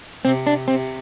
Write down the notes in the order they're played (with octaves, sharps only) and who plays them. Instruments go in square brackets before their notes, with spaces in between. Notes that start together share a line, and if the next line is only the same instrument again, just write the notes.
[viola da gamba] C3 [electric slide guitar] C4
[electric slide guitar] D4
[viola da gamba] C3 [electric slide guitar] C4